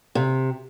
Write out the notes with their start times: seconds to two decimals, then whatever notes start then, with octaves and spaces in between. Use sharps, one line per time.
0.15 C3